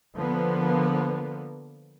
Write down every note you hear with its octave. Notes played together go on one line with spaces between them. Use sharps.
D3 F3 A#3 B3